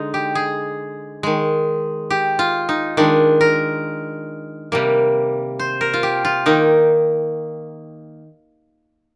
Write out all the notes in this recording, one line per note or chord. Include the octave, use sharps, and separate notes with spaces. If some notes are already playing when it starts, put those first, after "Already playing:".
Already playing: D3 G#3 D#4
G4
G#4
D#3 G#3
G4
F4
D#4
D#3 G#3 D4
A#4
C3 G3 A#3
C5
A#4
F4
G4
F4
D#3 A#3 D#4